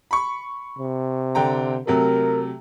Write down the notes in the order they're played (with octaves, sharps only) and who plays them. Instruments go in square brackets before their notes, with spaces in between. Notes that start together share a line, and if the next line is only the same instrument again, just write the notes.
[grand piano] B5 C#6
[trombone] C3
[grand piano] D3 G5 A#5
[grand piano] C3 F#3 A3 [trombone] A#4